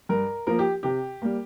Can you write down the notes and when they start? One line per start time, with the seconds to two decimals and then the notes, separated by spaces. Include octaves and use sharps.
0.09 G2 A#4
0.47 F3 A#3 A#4
0.59 G4
0.83 C3 G4
1.22 G3 A#3